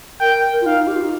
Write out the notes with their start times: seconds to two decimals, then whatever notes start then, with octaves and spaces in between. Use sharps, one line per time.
0.20 A#4 G5
0.61 F4
0.66 D#4 F5
0.87 G4
0.95 F4
1.04 D#4